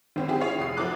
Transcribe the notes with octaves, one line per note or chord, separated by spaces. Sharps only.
G#1 C4 C#4
C4 E4 G4 G#4
F4 G#4 C#5 F5
F1 D#6 C7
F3 F#3 E4 A4 D6 F#6